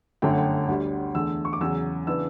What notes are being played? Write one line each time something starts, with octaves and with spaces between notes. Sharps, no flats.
G1 F#2 D3 A3 G5
F#5
G5
D2 D3 G3
E2 D3 A3 E6
C#6
D6
E2 C#3 F#3 E6
C#3 E3 B3 D4 E6